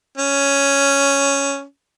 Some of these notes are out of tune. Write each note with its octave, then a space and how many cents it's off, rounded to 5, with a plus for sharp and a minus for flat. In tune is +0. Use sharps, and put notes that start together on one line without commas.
C#4 +5